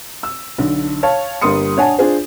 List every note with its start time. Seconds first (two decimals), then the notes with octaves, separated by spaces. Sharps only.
0.23 E6
0.58 B1 D3
1.03 C#5 F5 A5
1.41 G1 G3 A#3 C6 D#6 C#7
1.77 D4 C#5 F#5 G#5 A5
1.99 D4 F4 G#4 C5